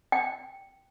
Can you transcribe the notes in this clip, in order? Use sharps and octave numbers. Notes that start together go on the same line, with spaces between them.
G5